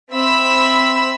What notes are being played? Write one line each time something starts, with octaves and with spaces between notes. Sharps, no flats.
C4 E5 B5 E6